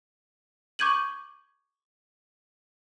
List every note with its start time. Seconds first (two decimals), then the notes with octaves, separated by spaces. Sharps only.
0.79 C#6 D6 G6 G#6 D#7 F#7